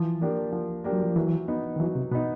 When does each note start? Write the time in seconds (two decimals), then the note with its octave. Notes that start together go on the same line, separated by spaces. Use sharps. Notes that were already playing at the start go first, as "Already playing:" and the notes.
Already playing: E3 F3
0.21 A#3 D4 G4
0.52 F3
0.84 A#3 D4 G4
0.92 F#3
1.04 F3
1.16 E3 F#3
1.48 B3 D#4
1.76 D#3
1.80 E3 F#3
1.95 C3
2.11 B2 B3 D#4